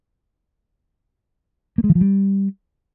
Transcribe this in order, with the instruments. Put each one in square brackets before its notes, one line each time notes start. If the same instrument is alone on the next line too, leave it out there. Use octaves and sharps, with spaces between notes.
[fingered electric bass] A#3
G#3
E3
F3
G3